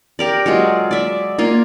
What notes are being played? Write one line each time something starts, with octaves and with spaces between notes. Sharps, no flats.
G4 A#4 D5
F#3 G#3 F4
D5 E5
A#3 F4 G#5